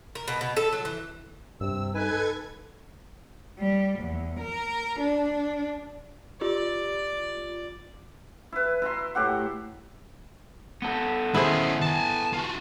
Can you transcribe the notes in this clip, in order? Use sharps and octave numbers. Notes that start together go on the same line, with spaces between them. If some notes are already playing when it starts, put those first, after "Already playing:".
A#4
B2
B2
A4
F#3
E3
G2 C3 E6
D#4 A4 B4 G#5 G#6
G3
E2
A#4
D4
F4 G4 D5
E4 B4
E4 A#5 C6
A2 G4 F#5
B3 A4
D#3 C#4 E4 G#4 C5
G#5 A5
F4 F#4